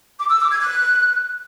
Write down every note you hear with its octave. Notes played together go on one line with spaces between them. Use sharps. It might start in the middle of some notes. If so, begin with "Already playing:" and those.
D6
E6
D6
G#6
F#6